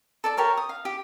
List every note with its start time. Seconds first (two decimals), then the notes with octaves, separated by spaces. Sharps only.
0.24 A4 D5 A5
0.37 G4 A#4 C#5 F5
0.57 D#6
0.69 F5
0.85 G4